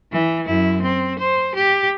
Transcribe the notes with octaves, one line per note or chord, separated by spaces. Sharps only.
E3
F#2 E4
C4
C5
G4